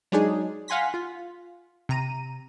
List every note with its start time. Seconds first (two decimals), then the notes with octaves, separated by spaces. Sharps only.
0.12 F#3 G#3 D4 D#4 G#4
0.68 F5 F#5 G#5 C6 A#6 B6
0.94 F4
1.89 C3 A#5 D#7